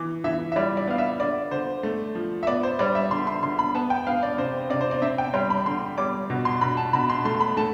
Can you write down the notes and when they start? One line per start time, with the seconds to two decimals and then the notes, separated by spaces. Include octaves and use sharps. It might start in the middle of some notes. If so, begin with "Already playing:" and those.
Already playing: E3 D6
0.24 E3 E5
0.52 E5
0.56 G3 D5
0.77 D5
0.87 B3 F5
0.98 E5
1.20 D3 D5
1.51 D3 C5
1.83 A3
2.15 F3
2.43 E5
2.47 B3 D5
2.63 C5
2.79 G3 D5
2.95 E5
3.10 D3 C6
3.27 C6
3.42 D3 C6
3.59 B5
3.75 B3 A5
3.90 G5
4.07 B3 F5
4.23 D5
4.38 C3 C5
4.70 C3 D5
4.81 C5
4.91 D5
5.02 C4 E5
5.18 G5
5.34 G3 C6
5.50 B5
5.65 D3 C6
5.98 G3 D6
6.30 B2
6.45 C6
6.61 B2 B5
6.77 A5
6.93 B2 B5
7.09 C6
7.25 A3 C6
7.40 B5
7.57 A3 A5